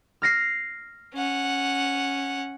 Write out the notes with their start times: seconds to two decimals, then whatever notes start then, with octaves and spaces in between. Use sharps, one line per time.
0.22 F6 A#6 C7
1.14 C#4 F#5